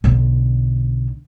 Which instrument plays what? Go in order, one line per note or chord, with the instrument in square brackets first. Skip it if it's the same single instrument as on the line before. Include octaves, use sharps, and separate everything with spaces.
[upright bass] B1 D3